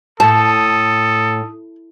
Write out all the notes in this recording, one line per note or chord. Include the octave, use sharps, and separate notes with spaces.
A2 A4 A5 D#6